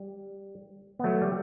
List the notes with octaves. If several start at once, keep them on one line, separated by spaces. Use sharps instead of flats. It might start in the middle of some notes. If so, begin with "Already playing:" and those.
Already playing: G3
B3
F#3 A3
G3